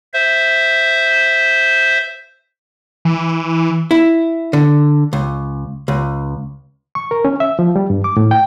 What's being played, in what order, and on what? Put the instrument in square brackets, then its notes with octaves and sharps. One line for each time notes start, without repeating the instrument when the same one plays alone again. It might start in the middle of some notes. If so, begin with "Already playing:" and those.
[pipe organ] C5 E5
[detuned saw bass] E3
[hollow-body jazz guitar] E4
D3
C#2
C#2
[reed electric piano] C#6
A#4
C#4
E5
F3
G3
G2
D6
A2
G5